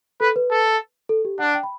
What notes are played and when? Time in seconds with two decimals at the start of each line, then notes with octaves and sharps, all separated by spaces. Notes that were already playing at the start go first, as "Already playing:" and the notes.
0.21 A4 B4
0.36 B4
0.51 A4
1.09 A4
1.25 G4
1.39 D4 F#5
1.54 G5
1.63 B5